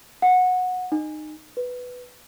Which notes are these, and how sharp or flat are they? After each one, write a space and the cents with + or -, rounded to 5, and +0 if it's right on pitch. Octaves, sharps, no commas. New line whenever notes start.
F#5 -15
D#4 -25
B4 +5